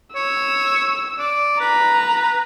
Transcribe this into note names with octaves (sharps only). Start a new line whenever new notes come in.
C#5 E6
D5
B4 A#5